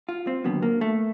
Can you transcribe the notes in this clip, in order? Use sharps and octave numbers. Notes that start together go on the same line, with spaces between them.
F4
C4
D#2 D3 F#3 B3
A#3
A3